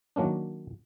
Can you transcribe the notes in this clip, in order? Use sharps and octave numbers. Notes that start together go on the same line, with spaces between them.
D#3 F#3 A#3 C#4 D4